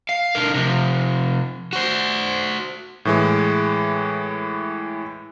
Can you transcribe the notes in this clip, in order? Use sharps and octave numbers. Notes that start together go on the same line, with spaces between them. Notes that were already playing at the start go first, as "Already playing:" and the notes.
F5
D3 A#4
C3 F3
F#4 C5
A2 E3 G#3